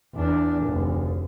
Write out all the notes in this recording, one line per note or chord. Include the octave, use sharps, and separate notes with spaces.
E2 D4
F1 D2